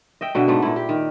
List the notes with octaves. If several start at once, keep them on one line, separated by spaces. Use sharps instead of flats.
D#5 E5 G5
B2 D3 E5
G#2 A3 B3
A#2 E4
G4
D#3